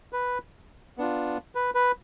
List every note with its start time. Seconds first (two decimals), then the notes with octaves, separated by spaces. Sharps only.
0.13 B4
0.98 B3 D4 F4
1.55 B4
1.75 B4